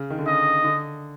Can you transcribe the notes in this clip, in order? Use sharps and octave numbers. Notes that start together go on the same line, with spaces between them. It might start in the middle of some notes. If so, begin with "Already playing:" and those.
Already playing: C#3
D#3
D3
C#3 D#5
D3